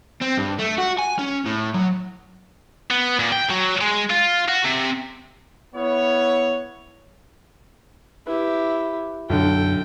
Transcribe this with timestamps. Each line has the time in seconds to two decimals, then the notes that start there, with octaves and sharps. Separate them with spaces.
0.21 C4
0.37 G2
0.59 A3
0.78 F#4
0.99 G#5
1.19 C#4
1.46 A2
1.74 F#3
2.91 B3
3.19 A#2
3.32 G5
3.50 F#3
3.81 G#3
4.10 F4
4.49 F#4
4.65 C3
5.76 B3 E4 C#5
8.27 E4 G4 B4
9.30 B1 F#2 D3 A4 G5